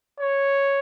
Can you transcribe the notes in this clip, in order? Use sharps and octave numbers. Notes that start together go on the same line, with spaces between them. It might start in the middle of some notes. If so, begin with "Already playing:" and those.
C#5